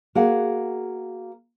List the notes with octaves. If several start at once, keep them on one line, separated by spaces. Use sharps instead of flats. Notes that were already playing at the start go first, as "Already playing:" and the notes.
A#3 F#4 G#4 F#5